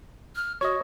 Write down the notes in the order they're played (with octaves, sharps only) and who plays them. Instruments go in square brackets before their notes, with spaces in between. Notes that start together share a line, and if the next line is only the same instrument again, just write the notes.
[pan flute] F6
[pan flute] F#4 [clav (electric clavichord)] C#5 D#5